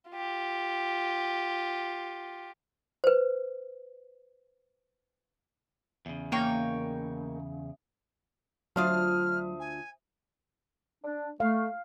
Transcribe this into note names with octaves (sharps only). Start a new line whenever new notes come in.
F4 G4
B4 C5
E2 C#3
A#3 D#4 C#5 G5
D2 F#3 D4 F4 C5 E5 D#6 F6
G#5
D4
A3 F5